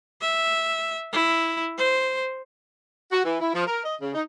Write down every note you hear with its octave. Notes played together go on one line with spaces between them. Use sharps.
E5
E4
C5
F#4
E3
E4
F3
A#4
D#5
C#3
D#4